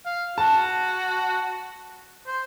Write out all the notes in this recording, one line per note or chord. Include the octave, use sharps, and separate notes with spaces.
F5
F#4 A5
C5